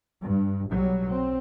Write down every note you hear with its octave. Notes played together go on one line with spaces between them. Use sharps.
G2
B1 F#3 G3
C4